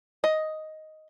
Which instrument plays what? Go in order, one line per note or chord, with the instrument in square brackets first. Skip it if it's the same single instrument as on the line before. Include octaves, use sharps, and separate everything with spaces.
[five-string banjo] D#5